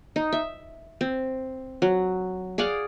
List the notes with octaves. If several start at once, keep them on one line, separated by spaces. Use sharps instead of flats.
D#4
E5
C4
F#3
G#4 D5 F5 F#5